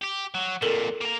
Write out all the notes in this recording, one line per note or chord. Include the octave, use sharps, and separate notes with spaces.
G4
F#3
F2 A#2 A4 A#4
A#3 A#5